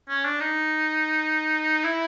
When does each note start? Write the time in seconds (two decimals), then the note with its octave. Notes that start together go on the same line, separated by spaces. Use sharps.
0.09 C#4
0.25 D4
0.40 D#4
1.84 E4